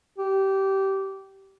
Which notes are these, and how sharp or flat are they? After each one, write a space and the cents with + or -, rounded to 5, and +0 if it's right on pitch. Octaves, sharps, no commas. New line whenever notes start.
G4 -20